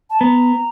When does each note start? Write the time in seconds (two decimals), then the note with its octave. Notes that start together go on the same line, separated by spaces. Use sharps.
0.10 A5
0.20 B3 A#5